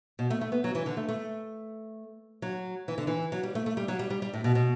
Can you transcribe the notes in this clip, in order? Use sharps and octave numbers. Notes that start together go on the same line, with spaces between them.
B2
A3
A3
B3
F#3
E3
D3
A3
A3
F#3
E3
D3
E3
F#3
G3
A3
A3
G3
F#3
G3
G3
G3
A2
B2
B2